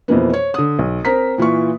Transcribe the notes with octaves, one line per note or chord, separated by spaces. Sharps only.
F2 B2 E3 A#3 B3
C#5
D3 D#6
B1
C4 A#4 C5 A#5 B6
A#2 E3 F4 C#6